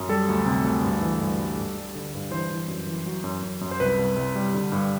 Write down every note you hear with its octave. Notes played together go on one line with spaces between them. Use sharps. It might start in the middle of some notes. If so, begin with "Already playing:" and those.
Already playing: F#2
G3 A4
D2
C3
D2
G2
E3
G2
G3
G2
G3
D3
G2
E3 C5
E3
F#2
E3
F#3
F#2
F#2
F#2
C5
C2 B4
C2
C2
G3
D3
G2